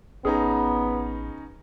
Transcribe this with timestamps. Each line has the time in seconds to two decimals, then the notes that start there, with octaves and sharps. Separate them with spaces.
0.25 A1 B3 C#4 D#4 G#4 A#5